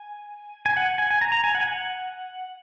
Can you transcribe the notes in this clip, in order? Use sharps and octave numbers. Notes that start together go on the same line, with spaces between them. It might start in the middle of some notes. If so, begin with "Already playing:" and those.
Already playing: G#5
G#5
F#5
G#5
G#5
A#5
A#5
G#5
F#5
G#5
F#5